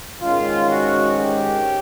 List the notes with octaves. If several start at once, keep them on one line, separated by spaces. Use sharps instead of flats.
G#2 D#3 G#3 C#4 F4
F#4
G4